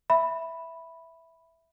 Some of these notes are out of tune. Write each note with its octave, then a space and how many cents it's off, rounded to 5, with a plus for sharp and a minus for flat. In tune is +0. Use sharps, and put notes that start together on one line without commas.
E5 +0 B5 +0